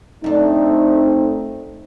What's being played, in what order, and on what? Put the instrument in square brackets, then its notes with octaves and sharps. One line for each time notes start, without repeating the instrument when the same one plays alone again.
[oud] F#2 D4 [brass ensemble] A3 C4 D#4